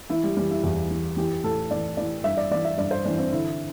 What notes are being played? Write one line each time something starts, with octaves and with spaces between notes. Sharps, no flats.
E3 E4
G3
E3 G3
E4
E2
E3
E3 G4
A2 A4
E3 D5
E3 D5
G2 E5
D5
E3 D5
E5
G2 D5
C5
E3 D4
C4
D3 E4